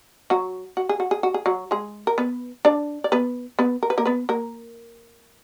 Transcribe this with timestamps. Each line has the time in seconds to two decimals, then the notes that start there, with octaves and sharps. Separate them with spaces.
0.30 F#3 F#4
0.77 F#4
0.89 G#4
1.00 F#4
1.11 G#4
1.23 F#4
1.34 G#4
1.46 F#3 F#4
1.71 G#3 G#4
2.07 A#4
2.18 B3 B4
2.65 D4 D5
3.04 D5
3.12 B3 B4
3.59 B3 B4
3.83 A#4
3.90 B4
3.98 A#3 A#4
4.06 B3 B4
4.29 A#3 A#4